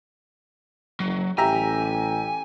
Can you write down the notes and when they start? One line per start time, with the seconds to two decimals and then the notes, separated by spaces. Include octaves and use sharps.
1.00 F#1 F#3
1.38 A1 G4 E5 G#5 A#5